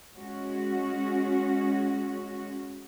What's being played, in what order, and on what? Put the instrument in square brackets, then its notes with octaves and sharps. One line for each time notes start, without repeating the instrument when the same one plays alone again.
[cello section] G#3 C#4 F#4